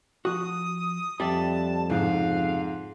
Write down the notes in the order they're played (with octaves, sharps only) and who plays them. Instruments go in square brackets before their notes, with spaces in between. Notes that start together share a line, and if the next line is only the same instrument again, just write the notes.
[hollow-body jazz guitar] F3 F#4 [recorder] D#6
[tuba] F2 [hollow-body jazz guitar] G3 D5 E5 [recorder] A5
[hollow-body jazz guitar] C#2 C3 F3 [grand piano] G#2 [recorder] F5